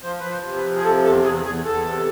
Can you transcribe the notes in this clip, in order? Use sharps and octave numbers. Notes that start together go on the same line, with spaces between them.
F3 C5
F3 B4
C5
C3
B4
F3
G#4
C3 A4
E2 A4
E2 G#4
E2 G#4
E2 A4
C3